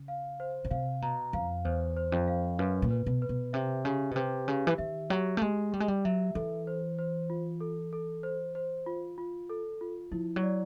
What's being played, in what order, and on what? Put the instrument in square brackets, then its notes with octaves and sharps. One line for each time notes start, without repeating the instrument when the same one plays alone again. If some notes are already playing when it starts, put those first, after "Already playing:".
Already playing: [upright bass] C#3
[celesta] F5
C5
[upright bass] C#3
[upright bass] C3 [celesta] F5
[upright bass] B2 [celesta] A#5
[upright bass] F2 [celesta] F5
[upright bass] E2 [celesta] C5
[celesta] C5
[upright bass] F2
[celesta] F5
[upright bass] F#2 [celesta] B4
[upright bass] A#2
[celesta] B4
[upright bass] B2
[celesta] B4
[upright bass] B2
[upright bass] C3 [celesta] E5
[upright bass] C#3 [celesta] G4
[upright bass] B2
[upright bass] C3 [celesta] B4
[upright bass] C#3 [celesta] G4
[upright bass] E3
[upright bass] D#3 [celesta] E5
[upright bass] F#3 [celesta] G4
[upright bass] A3
[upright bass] G#3 [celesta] G4
[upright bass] G3 [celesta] G4
[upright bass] G#3
G3
[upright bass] F#3 [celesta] E5
[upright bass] E3 [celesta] A4
[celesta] C5
C5
F4
A4
A4
C5
C5
F4
F4
A4
F4
[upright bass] F3 [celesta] E4
[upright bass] F#3
[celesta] D5